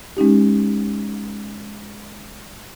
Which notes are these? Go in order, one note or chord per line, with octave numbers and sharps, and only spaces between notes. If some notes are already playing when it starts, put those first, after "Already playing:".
G#3 C#4 D#4 G4